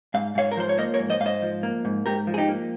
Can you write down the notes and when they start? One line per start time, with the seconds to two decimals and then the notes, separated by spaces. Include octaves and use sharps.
0.14 G#2 F5
0.35 G#2 C#5 F5
0.52 A#4
0.57 F3 C5
0.69 C#5
0.78 A#3 C5 D#5
0.94 A#4 C#5
0.99 G#2
1.10 C5 D#5
1.20 G#2 F5
1.26 C5 D#5
1.42 F3
1.63 A#3
1.85 G#2
2.06 G#2 G4 A#4
2.27 F3
2.34 G#4
2.38 D#4 G4
2.49 A#3